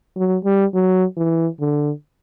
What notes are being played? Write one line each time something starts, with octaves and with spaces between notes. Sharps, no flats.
F#3
G3
F#3
E3
D3